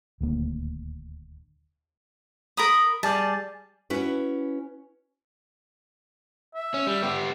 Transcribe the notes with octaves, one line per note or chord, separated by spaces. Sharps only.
D#1 D2 A#3
A#4 B5 D#6
G3 G#4 D5 A5
C#4 E4 F#4 B4
E5
C#4
G3
B3 G4